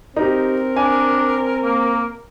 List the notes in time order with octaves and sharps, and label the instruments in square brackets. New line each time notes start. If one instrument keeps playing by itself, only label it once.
[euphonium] C4 [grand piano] D#4 G4 [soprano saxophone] A#4
[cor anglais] D4 [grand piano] G#5
[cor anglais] A#3